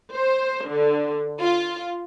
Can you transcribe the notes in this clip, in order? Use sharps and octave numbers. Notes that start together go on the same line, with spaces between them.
C5
D3
F4